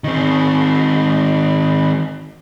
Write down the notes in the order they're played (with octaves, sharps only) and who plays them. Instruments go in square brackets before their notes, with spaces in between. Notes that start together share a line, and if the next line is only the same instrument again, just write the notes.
[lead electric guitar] D#3 C4